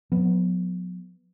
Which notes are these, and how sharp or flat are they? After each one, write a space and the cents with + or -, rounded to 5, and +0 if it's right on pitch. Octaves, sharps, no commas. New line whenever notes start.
F#3 -40 B3 +0